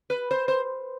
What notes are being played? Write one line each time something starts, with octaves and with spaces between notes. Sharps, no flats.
B4
C5
C5